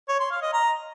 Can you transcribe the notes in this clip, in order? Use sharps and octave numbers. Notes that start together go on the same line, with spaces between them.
C#5
C6
F5
D#5
A#5